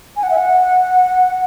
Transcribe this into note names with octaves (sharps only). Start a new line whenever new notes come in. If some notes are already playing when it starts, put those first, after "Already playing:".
G#5
F#5
E5
F#5